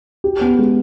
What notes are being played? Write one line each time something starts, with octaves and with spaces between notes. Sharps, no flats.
G4
B3
G#3